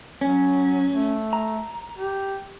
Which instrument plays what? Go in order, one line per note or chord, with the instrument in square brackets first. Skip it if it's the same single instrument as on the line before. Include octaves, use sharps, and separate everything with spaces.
[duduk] F#3 [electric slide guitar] C#4
[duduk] A3
[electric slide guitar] A#5
[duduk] G4